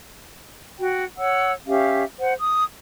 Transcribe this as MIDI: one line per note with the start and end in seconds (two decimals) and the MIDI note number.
0.79 1.03 66
0.79 1.03 79
1.17 1.53 73
1.17 1.53 78
1.17 1.53 88
1.67 2.03 61
1.67 2.03 67
1.67 2.03 76
1.67 2.03 77
2.20 2.34 72
2.20 2.34 78
2.39 2.63 87